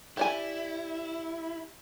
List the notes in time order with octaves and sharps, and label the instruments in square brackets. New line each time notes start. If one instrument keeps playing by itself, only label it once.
[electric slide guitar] E4 [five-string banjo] G4 D5 G#5